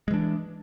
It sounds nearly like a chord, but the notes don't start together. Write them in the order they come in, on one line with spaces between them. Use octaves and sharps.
G#3 E3 D4